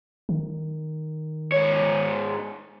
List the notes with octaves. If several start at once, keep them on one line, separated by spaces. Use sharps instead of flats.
D#3
G#2 C#5